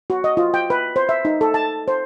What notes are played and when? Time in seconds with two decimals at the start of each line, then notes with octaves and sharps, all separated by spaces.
0.10 F#4
0.24 D#5
0.37 F4
0.54 G5
0.70 B4
0.96 C5
1.09 E5
1.25 D#4
1.41 A4
1.54 A5
1.88 C5